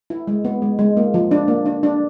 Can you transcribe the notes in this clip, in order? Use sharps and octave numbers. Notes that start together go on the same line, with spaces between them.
E4
G#3
B3
G#3
G#3
A#3
F3
D4
A#3
D4
D4